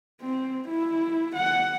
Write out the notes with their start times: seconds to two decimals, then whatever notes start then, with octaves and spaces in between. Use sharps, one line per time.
0.21 C4
0.68 E4
1.36 F#5